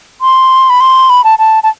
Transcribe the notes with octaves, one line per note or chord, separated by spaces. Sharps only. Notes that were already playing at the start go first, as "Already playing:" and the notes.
C6
B5
C6
B5
A5
A5
A5